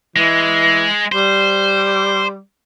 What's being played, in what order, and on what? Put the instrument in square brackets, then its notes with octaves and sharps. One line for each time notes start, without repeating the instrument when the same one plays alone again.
[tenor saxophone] E3 [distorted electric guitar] G#3
[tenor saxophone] G3 [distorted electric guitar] C5